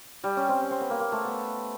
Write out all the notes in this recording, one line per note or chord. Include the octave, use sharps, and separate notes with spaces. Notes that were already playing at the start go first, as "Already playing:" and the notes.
G3
C#4
C4
C#4
C4
B3
A#3
A#3
A3
B3